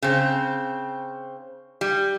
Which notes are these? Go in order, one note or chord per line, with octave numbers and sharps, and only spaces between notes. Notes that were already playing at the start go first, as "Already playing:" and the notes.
C#3 C4
G3